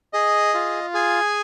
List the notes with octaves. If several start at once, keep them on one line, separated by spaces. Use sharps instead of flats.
G#4 D#5
F4
G#4 G#5